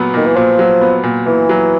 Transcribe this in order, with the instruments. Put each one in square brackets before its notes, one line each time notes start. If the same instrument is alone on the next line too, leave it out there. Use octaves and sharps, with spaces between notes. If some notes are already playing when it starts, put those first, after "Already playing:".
Already playing: [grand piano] A#2 F#3 B3
[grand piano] A#2 [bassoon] D#3
[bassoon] E3
[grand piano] A#2 [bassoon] F3
[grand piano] F#3
B3
A#2
[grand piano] A#2 [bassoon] E3
[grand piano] F#3